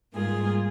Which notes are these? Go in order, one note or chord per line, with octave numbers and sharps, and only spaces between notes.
G#2 G3 A#3 F4 G#4